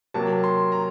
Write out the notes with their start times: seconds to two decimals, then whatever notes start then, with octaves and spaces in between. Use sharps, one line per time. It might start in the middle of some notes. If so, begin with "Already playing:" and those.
0.14 C3 F#3 A#3 A5
0.44 C6
0.72 A#5